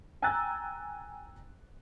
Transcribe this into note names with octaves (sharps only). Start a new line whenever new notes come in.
G5 G#5 A#5 E6 F#6 A6